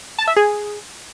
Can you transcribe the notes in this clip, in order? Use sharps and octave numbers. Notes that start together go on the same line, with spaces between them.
A5
E5
G#4